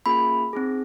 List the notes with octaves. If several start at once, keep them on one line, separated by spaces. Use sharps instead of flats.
A#3 C#4 F4 G#4 B5
C4 D#4 G#4